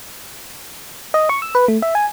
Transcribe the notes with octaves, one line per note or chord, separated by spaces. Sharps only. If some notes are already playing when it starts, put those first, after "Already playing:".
D#5
C#6
E6
B4
A3
E5
G#5